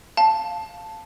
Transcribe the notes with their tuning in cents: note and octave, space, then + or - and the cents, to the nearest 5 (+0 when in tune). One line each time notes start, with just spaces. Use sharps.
F5 +0 A5 +0